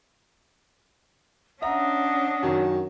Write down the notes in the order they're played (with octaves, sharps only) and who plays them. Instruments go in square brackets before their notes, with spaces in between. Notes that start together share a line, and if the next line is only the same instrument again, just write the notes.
[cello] C#4 D4 [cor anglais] D#5 [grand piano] E5 A#5 [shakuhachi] F#5
[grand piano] F#2 D#3 F#3